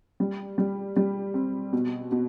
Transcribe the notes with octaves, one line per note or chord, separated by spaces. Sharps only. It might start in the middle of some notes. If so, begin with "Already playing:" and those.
G3
G3
G3
C4
B2
B2